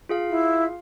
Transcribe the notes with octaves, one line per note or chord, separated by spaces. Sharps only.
F4 G#4 F5
E4